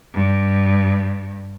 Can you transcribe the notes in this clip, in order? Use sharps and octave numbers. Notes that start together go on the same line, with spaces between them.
G2